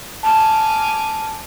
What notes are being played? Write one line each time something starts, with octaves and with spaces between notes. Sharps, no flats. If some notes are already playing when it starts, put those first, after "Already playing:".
G#5 A5 D6 F6